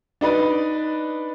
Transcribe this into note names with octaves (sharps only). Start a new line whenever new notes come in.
D4 D#4 B4 D5